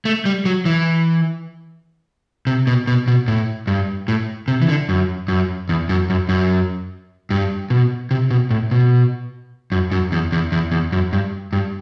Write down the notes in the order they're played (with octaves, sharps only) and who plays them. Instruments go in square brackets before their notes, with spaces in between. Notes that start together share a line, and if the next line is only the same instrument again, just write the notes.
[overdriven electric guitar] A3
G3
F#3
E3
C3
B2
B2
B2
A2
G2
A2
C3
E3
D3
F#2
F#2
E2
F#2
F#2
F#2
G2
B2
C3
B2
A2
B2
F#2
F#2
E2
E2
E2
E2
F#2
G2
G2